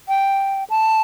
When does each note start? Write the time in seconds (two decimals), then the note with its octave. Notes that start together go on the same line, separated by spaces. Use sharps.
0.08 G5
0.70 A5